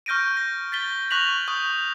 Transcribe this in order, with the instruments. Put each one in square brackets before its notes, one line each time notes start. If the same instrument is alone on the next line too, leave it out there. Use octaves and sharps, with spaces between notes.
[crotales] C#6 F6 G6 A#6 D7 D#7
A#6
A6 B6 G7
C#6 F#6 A#6 B6 F7 F#7
C#6 D#6 G6